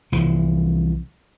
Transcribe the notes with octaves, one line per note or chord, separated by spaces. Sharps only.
C2 E3 F3